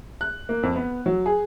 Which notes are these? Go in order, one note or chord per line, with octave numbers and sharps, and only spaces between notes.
F#6
A#3
F2
B3
F#3
G#4